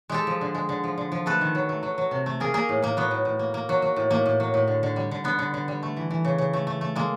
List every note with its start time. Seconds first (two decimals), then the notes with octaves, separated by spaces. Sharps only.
0.10 G#3 G4 A4
0.27 F3
0.41 D3
0.55 G#3
0.69 D3
0.84 F3
0.98 D3
1.12 F3
1.26 A3 A4 B4
1.41 D#3
1.55 F#3
1.69 A3
1.83 F#3
1.98 F#3
2.11 C3
2.26 A3
2.40 A#3 G#4 A#4
2.54 A#3 G#4 A#4
2.69 A2
2.82 A2 A#3
2.97 F#3 B3
3.11 A2
3.25 A2
3.39 A#3
3.54 A#3
3.69 F#3
3.82 F#3
3.96 A2
4.11 A2 A#3
4.26 A2
4.40 F#3
4.54 A2
4.68 D3
4.83 D3
4.96 G3
5.11 D3
5.24 D3 B3
5.39 D3
5.54 D3
5.68 G3
5.83 A3
5.97 E3
6.11 E3
6.25 C#3
6.38 C#3
6.53 A3
6.67 A3
6.81 A3
6.96 G#3 A#3